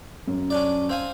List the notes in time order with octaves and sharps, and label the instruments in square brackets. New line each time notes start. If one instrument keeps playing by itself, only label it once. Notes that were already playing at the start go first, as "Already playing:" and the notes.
[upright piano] F#2
[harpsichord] C#4 D4 D5
C4 F5 G#5